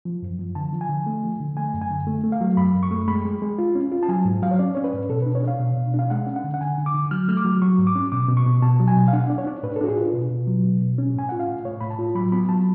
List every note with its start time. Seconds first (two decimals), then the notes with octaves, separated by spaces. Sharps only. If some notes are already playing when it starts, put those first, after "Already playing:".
0.05 F3
0.22 F#2
0.39 F3
0.55 D3 A5
0.73 F3
0.81 G#5
0.89 D3
1.06 A3
1.23 F3
1.40 D3
1.57 A3 G#5
1.74 F#2
1.82 G#5
1.90 D3
2.07 A3
2.24 A3
2.32 F5
2.41 F#3
2.57 F#2 B5
2.74 F#2
2.83 C#6
2.91 A3
3.08 G#3 B5
3.25 G#3
3.42 G#3
3.58 F4
3.75 C#4
3.92 F4
4.03 A5
4.09 F#3 G#5
4.25 G#2
4.42 F#3 F5
4.51 C#5
4.59 C#4 D5
4.75 C#4 C#5
4.84 B4
4.93 G#2
5.09 B2 A4
5.22 B4
5.26 D4
5.35 C#5
5.44 D4 F5
5.60 B2
5.77 B2
5.94 D4 F5
6.10 G#3 F#5
6.27 C#4
6.36 F#5
6.44 D3
6.54 F#5
6.61 D3 G#5
6.78 D3
6.86 D6
6.95 D3
7.11 F#3 F6
7.28 A3 F6
7.37 D6
7.45 F#3
7.62 F#3 C#6
7.78 G#2
7.87 D6
7.95 C#4
8.12 B2 D6
8.29 B2
8.37 C#6
8.46 B2
8.62 B2 A5
8.80 F#3
8.88 G#5
8.96 B2
9.08 F5
9.13 D4 F#5
9.30 D4
9.38 C#5
9.47 D4
9.63 A2 B4
9.76 A4
9.81 D4 F#4
9.88 G#4
9.97 F4 B4
10.13 B2
10.31 B2
10.47 F#3
10.64 B2
10.81 B2
10.98 C#4
11.14 A2 G#5
11.29 F4 F#5
11.40 F5
11.49 A2
11.65 A2 C#5
11.81 A2 B5
11.91 A5
11.99 F4
12.15 F#3 B5
12.32 B3 B5
12.49 F#3 A5